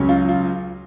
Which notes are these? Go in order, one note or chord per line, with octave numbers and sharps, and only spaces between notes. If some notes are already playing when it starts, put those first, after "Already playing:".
Already playing: C#2 C#3 F#3 C#4
F4
F4